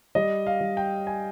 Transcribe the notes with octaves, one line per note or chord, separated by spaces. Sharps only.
G3 D#5
F5
G3
G5
G#5